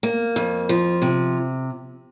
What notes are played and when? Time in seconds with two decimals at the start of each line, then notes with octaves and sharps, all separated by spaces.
0.03 A#3
0.36 F2
0.69 F3
1.02 C3